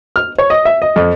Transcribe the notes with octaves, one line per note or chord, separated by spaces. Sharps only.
F6
C#5
D#5
E5
D#5
F2